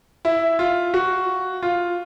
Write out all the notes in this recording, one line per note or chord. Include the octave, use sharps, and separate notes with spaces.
E4
F4
F#4
F4